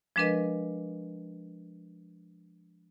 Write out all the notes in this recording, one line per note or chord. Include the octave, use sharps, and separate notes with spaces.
F3 G#3 D4 A#4 B4 D#5